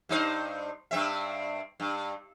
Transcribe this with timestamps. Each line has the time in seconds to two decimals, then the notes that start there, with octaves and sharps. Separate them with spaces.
0.09 G2 D#4 C5
0.91 G2 C4 E5
1.80 G2